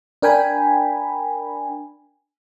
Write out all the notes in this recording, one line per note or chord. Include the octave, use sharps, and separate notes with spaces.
D4 A#4 G5 G#5 B5